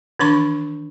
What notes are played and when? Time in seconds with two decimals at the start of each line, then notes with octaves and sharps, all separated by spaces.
0.20 D#3 E3 D4 B5 C#6